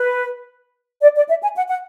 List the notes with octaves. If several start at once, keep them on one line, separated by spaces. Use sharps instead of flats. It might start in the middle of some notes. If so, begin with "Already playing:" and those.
Already playing: B4
D5
D5
E5
G#5
F#5
F#5